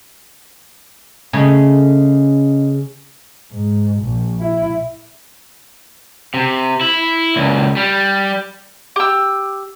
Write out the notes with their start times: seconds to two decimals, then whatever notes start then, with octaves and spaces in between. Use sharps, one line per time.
1.33 C#3 A3 C#4 D#5
3.52 G#2
4.03 A#1
4.40 E4
6.34 C3
6.81 E4
7.36 C#2 A#2
7.77 G3
8.96 G4 E6